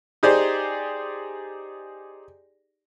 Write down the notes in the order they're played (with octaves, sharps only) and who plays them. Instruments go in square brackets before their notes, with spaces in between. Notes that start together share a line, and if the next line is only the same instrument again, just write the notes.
[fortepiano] D#4 G4 G#4 C5 D5